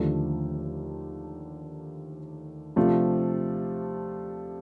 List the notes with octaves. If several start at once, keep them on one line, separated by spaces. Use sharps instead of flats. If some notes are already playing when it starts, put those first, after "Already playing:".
Already playing: D#2 D3 F3 A3
C3 F3 A3 D4 F4